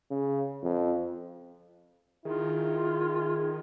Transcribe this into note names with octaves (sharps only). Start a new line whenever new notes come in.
C#3
F2
D#3 E4 F4 G#4